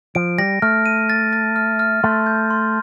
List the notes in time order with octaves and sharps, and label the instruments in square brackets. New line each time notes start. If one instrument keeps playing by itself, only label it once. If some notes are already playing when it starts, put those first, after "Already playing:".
[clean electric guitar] F3 [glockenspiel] D7
[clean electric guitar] G3 [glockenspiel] A#6
[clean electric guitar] A3 [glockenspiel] F6
[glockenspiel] D#7
A6
A6
F6
F6
[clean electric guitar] A3 [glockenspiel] C6
[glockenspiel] G6
C6